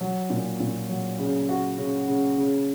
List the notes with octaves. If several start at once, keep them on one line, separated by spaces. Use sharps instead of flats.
F#3
A#2
A#2
F#3
C#3
F#4
C#3
C#3
C#3